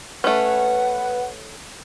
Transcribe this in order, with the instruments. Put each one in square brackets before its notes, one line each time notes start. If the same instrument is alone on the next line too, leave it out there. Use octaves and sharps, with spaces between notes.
[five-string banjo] A3 C#4 [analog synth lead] B4 [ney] F#5